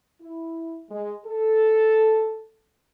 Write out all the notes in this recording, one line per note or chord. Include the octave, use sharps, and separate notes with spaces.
E4
G#3
A4